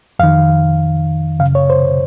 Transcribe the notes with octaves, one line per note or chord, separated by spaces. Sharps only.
F2 D#3 F5
F#2 C#3 F5
C#5
C5